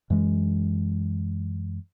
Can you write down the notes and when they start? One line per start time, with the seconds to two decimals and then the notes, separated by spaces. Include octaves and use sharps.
0.10 F#2 E3 G#3